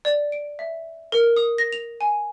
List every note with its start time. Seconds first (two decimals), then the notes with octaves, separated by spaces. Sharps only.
0.05 D5
0.32 D7
0.59 E5
1.12 A#4
1.37 D#6
1.58 A#6
1.73 F7
2.01 G#5